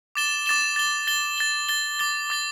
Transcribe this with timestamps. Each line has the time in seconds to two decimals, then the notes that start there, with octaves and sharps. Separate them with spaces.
0.15 D6 A6 E7 G7
0.46 D6 A6 E7 G7
0.76 A6 G7
1.07 A6 G7
1.38 A6 G7
1.69 A6 G7
1.99 D6 A6 G7
2.30 D6 A6 G7